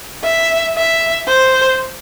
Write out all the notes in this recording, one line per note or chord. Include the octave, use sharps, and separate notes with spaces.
E5
E5
C5